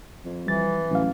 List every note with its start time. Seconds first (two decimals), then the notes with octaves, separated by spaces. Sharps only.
0.25 F2
0.47 E3 G3 A6
0.91 A1 A2 F#3 F5